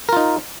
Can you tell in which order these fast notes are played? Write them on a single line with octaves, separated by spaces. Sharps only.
A#4 F4 D#4